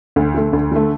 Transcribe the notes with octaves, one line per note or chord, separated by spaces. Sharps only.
D2
D3 A3
D2
D3 A3